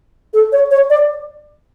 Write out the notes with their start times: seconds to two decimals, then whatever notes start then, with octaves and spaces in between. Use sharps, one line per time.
0.33 A4
0.52 C#5
0.71 C#5
0.90 D5